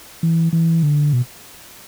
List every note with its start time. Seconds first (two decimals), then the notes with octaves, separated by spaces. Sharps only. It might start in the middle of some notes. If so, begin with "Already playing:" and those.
0.23 E3
0.53 E3
0.83 D3
1.13 B2